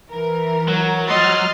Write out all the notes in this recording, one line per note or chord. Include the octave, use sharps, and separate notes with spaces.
E3 A#4
F#3
F3 G#3 D#5 C6 F6 A6